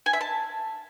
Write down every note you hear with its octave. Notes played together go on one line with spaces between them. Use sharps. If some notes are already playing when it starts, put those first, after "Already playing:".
G#5
E5
A5